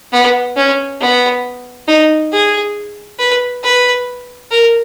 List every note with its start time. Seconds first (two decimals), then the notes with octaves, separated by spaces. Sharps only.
0.13 B3
0.56 C#4
1.01 B3
1.88 D#4
2.32 G#4
3.19 B4
3.64 B4
4.51 A#4